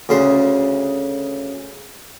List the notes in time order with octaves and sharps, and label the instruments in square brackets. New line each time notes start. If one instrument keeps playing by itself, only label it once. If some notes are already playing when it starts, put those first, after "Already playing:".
[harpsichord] D2 C#3 E5 C6